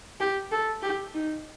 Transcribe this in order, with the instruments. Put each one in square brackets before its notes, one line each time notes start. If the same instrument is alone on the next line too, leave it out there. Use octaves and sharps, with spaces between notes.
[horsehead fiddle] G4
A4
G4
D#4